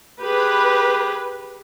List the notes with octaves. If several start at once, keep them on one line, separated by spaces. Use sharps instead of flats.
G4 G#4 B4